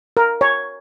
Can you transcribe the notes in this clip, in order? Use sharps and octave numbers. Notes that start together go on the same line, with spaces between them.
A#4
C#5